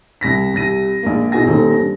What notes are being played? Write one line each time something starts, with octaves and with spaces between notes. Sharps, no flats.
C2 A#6 B6
C2 C3 A#6 D#7
A#1 G#3 A#3
B2 E4 G#4 G#5 A#6
D#1 D#2 C4 A4
G2